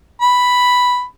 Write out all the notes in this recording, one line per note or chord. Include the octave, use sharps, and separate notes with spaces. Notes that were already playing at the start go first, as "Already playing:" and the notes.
B5